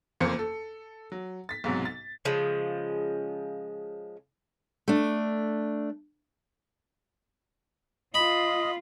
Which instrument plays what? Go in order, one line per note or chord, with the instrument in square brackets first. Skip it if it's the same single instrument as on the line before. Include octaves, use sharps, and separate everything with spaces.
[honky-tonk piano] F#1 F2 A#3 C5 C#7
A4
F#3
A6 B6
B1 G#2 C3 F#3
A6
[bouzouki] C#3 F3 G#3
[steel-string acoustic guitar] A3 D4
[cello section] F4 [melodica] D#5 [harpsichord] B5